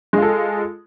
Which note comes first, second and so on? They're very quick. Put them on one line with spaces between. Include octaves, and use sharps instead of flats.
G#3 F4 A4